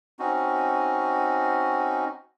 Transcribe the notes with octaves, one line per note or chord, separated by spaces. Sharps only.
C4 C#4 D#4 F#4